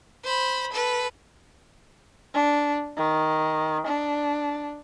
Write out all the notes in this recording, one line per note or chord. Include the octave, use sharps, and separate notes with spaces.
C5 B5
A4 B4
D4
D#3
D4